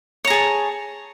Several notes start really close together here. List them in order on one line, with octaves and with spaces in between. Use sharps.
C#5 A#5 G#4 A5